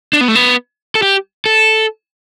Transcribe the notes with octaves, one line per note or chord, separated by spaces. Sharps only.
D4
B3
A3
B3
A4
G4
A4